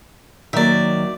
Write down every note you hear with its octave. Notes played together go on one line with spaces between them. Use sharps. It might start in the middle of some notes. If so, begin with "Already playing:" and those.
D#3 F#3 A#3 D5 E5